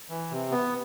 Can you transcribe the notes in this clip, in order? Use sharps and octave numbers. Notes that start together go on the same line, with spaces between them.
E3
C3
B3